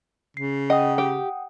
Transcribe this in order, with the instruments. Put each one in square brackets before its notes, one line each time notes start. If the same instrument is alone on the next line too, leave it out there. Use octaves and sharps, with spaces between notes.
[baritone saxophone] C#3 [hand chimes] C7
[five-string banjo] D#5 [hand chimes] F#5 G5 D#6
[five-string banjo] G4